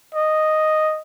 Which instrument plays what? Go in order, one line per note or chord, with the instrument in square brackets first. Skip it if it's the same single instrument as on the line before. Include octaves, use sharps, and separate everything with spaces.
[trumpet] D#5